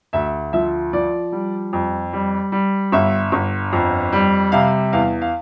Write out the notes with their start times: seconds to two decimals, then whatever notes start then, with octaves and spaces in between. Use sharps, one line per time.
0.13 D2 E5
0.53 F3 E5
0.93 F3 D5
1.32 G3
1.73 F2
2.13 G3
2.52 G3
2.92 G1 E5
3.32 G1
3.73 F2
4.12 G3
4.52 C3 F5
4.93 E2 F5
5.22 F5